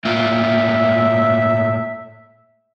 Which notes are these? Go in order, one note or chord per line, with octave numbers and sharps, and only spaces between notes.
A2 A#3 F4 E5